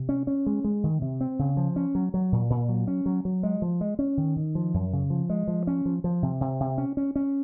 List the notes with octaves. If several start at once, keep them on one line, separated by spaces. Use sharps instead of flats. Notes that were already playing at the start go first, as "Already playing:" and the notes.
Already playing: C3
C#4
C#4
G#3
G#3
D#3
C3
C4
C#3
F3
C#4
F#3
F#3
A#2
A#2
F#3
C#4
F#3
F#3
G#3
F3
G#3
C#4
D#3
D#3
F3
F#2
C#3
F3
G#3
F3
C#4
F3
F3
C3
C3
C3
C#4
C#4
C#4